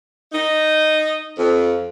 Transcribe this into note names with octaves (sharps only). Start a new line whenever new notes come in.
D#4
F2